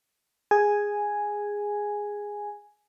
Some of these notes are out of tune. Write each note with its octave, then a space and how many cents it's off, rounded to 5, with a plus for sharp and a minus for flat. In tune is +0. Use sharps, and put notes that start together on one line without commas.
G#4 -10 G#5 +0